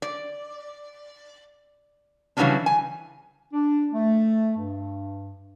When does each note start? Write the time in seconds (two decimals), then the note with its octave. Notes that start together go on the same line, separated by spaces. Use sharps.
0.02 D5
2.37 C#3 E3 F#3 G3 C#4 D4
2.66 G#5
3.53 D4
3.93 A3
4.58 G2